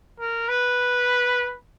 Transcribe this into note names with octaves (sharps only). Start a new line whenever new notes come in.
A#4
B4